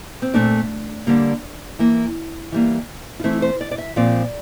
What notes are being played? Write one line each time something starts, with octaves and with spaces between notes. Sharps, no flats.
C4
A#2 A3 C4 D4
D3 G3 A#3
E3 A#3
E3 G3 A#3
F4
E3 A3 C4 E4
C5
D5
D5
E5
A#2 F3 C4 D5